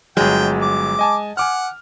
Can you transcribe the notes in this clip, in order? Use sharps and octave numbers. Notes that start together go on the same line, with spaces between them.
G1 F#3 G#3 G5
D6
D#5 G#5 A5
F#5 G#5 D6 F6